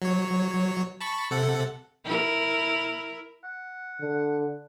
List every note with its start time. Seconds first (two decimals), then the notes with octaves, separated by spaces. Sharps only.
0.02 F#3 C#5
1.01 A5 B5 C#6
1.31 C3 A4 F#5
2.05 E4 A#4
3.44 F#5
4.01 D3